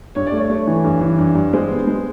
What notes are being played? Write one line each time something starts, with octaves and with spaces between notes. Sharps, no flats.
G2 C#5
D5
A3
C#5
A3
E3
G2
E3
G2
G2
G#3 C5
B3
G#3